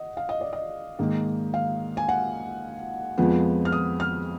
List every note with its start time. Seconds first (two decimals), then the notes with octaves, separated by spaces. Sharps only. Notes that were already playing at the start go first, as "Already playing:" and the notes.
Already playing: D#5 F#5
0.17 F5
0.29 D#5
0.41 D5
0.53 D#5
0.99 G#2 D#3 A#3
1.54 F5
1.97 G#5
2.09 F#5
3.18 F2 F3 G#3 B3
3.65 F6
3.72 D#6
4.00 F6